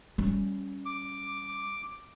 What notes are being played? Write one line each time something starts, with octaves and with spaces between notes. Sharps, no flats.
G3 C#4
D6